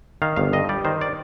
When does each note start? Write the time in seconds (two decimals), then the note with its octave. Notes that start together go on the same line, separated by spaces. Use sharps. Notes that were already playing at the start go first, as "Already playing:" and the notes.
0.22 D#3 F5
0.36 G1 F5
0.53 G2 D#5
0.69 G3 D5
0.85 D#3 C5
1.01 D5